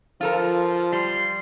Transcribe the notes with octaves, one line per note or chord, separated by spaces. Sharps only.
F3 F4 A4 A#4
G3 C6